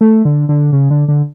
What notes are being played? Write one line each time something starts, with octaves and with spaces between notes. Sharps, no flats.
A3
D3
D3
C#3
D3
D3